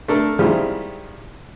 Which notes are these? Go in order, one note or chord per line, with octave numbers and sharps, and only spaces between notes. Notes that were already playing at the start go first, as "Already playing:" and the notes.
A3 D4 A4 A#4
D#3 F3 G3 G#3 E4 G4